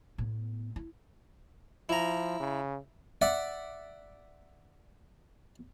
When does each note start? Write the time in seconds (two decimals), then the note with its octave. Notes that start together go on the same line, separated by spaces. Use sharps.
0.18 A2 B3
0.76 E4
1.89 F3 E4 A#5
2.40 C#3
3.22 D5 E5 F#5